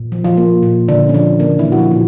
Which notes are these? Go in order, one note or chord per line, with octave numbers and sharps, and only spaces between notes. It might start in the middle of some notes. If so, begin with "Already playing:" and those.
Already playing: A#2
F3
F3 F4
A#3
A#2
A#2 D3 D4
C#4
D3 F3 D4
D3 A#3 D4
E3 E4
A#2
F#4
F3 F4
A#2